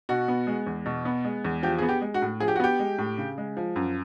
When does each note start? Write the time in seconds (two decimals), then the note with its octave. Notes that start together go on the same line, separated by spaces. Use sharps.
0.09 B2 F#4
0.28 B3
0.47 G#3
0.67 E2
0.86 B2
1.05 B3
1.25 G#3
1.45 E2
1.63 F3 G4
1.78 B3 G#4
1.89 G4
2.01 G#3
2.14 F#4
2.22 A2
2.40 F3 G#4
2.48 G4
2.56 F#4
2.60 B3 G4
2.80 G#3
2.98 A2
3.18 C#3
3.38 G#3
3.57 F3
3.76 F#2